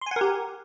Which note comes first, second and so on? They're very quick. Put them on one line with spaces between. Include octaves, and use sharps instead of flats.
C6 G#5 F#5 A#4 G4